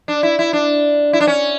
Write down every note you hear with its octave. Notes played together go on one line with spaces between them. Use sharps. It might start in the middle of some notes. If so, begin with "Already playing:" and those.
D4
E4
E4
D4
E4
D4
C#4